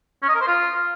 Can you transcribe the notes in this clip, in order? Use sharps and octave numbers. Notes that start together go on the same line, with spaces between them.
C#4
D#5
A#4
C5
F4